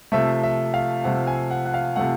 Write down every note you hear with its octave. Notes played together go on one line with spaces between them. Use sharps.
C3 F3 A3 E5
E5
F5
C3 F3 A3 F#5
G#5
F#5
F#5
F5
C3 F3 A3 F#5